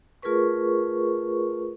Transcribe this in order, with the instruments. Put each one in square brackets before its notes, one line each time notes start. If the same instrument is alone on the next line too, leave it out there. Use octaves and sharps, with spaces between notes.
[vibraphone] A3 F4 G#4 A#4 B4 C#6